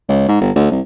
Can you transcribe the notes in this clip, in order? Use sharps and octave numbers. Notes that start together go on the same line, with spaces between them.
C#2
G#2
G1
D2
C2